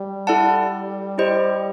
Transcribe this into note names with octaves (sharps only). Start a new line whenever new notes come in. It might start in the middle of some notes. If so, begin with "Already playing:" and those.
Already playing: G3
E4 A4 D5 F#5 A5
E4 G4 C5 D#5